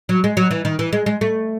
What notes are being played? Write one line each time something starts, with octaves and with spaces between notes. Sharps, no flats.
F#3
G#3
F#3
E3
D#3
E3
G#3
G#3
A3